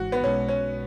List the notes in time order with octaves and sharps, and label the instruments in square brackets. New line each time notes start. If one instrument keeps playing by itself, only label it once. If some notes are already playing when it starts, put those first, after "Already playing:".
Already playing: [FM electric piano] G#1 G#2 E3 G#3 [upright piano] F#4
[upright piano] B3
[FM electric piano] B1 B2 G#3 [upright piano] C#4
[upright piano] C#4